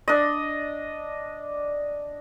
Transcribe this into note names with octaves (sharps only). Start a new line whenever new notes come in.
D4 D#5